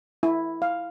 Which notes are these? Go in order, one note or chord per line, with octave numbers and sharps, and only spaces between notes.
E4
F5